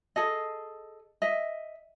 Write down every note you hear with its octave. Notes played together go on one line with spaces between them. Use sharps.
G#4 A4 D#5
D#5 E5